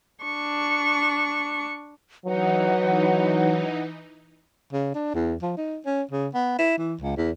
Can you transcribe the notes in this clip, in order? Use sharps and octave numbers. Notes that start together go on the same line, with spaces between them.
D4 C#6
E3 F#3 D#4 B4 F#5
C#3
D4
E2
F3
D#4
C#4
C#3
B3
E4
E3
C#2
E2